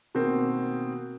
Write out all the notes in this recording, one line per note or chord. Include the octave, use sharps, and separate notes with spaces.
B2 D#3 A#3 C4